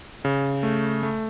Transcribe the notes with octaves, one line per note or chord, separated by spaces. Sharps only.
C#3
A3
A3